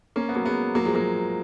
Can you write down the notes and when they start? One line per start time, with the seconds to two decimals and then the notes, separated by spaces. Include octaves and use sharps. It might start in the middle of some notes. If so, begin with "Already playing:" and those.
0.16 A#3 C#4
0.29 B3
0.35 F#3 A#3
0.45 G#3 B3
0.75 F#3 A#3
0.85 F3 G#3
0.94 F#3 A#3